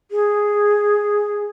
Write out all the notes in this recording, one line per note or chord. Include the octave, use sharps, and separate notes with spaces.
G#4